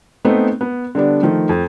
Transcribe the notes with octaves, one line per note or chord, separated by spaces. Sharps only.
A3 B3 C4 D#4
B3
D3 G3 B3 D4
D#3 F3 A3
F2